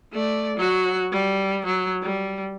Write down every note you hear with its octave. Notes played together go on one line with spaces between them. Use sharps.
A3 D5
F#3 F#4
G3
F#3
G3